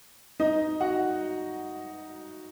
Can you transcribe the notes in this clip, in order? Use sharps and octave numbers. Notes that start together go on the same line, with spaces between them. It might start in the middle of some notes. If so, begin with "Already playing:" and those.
D#4 D#5
F#4 F#5